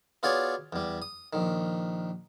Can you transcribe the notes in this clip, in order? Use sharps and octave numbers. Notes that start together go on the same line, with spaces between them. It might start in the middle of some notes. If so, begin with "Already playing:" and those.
B3 F4 F#4 G#4 C#5 D5
E2 G3
D#6
A#1 D#3